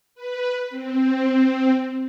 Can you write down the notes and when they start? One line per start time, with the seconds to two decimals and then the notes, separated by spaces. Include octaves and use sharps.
0.15 B4
0.70 C4